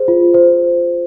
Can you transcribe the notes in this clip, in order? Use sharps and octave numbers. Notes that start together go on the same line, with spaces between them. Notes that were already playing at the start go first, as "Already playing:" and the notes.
Already playing: G#4 C5
F4
C5